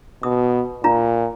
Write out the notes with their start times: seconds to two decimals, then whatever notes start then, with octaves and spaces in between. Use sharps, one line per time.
0.23 B2 D#6
0.84 A#2 F4 A#5